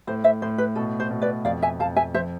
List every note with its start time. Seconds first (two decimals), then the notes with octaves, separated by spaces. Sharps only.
0.07 A2 C5
0.24 C5 E5
0.42 A2 C5
0.58 B4
0.75 B2 A4
1.00 C5
1.11 B2
1.22 B4 D5
1.45 F2 D5 F5
1.62 E5 G#5
1.79 F2 F5 A5
1.96 E5 G#5
2.14 F3 C5 E5